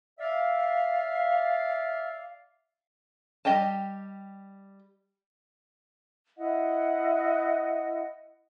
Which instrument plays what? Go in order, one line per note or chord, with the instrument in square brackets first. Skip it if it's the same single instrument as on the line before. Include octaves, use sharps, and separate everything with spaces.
[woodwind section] D5 E5 F5
[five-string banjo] G3 G4 D#5 G5 A5
[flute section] E4 D#5 F#5